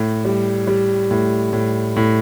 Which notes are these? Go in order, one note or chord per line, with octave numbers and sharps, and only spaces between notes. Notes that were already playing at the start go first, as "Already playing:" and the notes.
Already playing: A2
G3
G3
A2
A2
A2